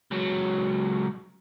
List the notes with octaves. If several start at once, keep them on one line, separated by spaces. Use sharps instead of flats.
C#2 F#3